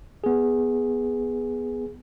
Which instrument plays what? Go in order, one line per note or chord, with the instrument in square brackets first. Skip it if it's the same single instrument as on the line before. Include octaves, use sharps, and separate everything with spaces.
[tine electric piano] B3 G#4